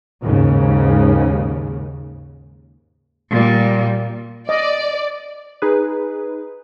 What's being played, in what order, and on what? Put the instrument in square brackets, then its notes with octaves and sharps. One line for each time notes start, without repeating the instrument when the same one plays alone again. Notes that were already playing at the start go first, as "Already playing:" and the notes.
[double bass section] D#2 G#2 C#3
[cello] A#2 G3
[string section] D5 [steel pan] D#5
[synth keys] D#4 G#4 B4